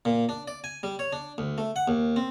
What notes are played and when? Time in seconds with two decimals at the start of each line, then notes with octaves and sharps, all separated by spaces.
0.05 A#2
0.29 D4
0.48 D5
0.64 G#5
0.83 G3
0.99 C#5
1.13 D4
1.38 D2
1.58 A3
1.76 F#5
1.88 D#2
2.16 C4